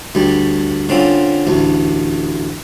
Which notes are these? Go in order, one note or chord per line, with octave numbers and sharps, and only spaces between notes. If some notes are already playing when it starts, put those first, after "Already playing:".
D2 G3
D3 C4 C#4 F4
A1 D2